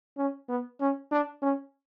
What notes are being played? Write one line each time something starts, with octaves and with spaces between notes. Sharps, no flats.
C#4
B3
C#4
D4
C#4